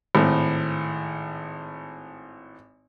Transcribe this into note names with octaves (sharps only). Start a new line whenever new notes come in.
G#1 A2